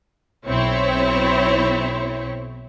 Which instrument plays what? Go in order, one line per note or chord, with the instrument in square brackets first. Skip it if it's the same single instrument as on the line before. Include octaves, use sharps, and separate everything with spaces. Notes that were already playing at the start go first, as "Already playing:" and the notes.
[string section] B1 C4 E4 C#5